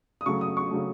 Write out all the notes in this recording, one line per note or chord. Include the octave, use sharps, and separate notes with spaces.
D#6
C#3 F#3 A3 C#6
D#6
C#6
C#3 F#3 A3